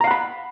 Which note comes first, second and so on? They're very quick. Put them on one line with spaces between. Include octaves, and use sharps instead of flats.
A#5 F5 F#5 B5